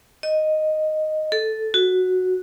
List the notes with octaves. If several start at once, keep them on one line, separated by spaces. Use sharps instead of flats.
D#5
A4
F#4